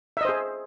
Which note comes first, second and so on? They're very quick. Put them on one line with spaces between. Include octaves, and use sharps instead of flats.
E5 D#5 C5 G#4